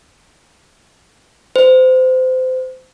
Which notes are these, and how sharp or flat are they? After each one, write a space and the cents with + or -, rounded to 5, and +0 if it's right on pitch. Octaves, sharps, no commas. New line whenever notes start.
C5 -25